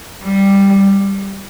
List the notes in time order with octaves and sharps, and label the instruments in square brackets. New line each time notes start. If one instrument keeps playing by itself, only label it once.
[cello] G3